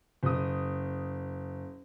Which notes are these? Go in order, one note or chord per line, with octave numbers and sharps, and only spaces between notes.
F#1 D#6